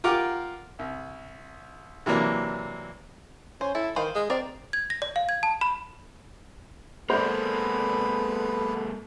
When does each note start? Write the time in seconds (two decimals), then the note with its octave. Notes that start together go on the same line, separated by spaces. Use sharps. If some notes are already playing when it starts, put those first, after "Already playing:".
0.04 F4 G4 A#4 F5 F#5 D6
0.79 C2
2.06 C3 E3 F#3 A#3 D4
3.61 C#4 C5
3.75 E4 A4
3.96 D#3 B4 C5 F5
4.15 G#3
4.30 C4 A#4 D5
4.73 G#6
4.90 A#6
5.02 D5
5.16 F5
5.29 G#6
5.43 A5
5.61 B5
7.10 G#3 A#3 B3 A4 B4 C5 D5